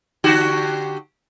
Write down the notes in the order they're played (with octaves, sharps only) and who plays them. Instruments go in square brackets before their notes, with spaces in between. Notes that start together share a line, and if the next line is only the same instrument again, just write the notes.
[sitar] D3 F#4 G4